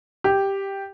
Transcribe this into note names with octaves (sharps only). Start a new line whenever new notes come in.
G4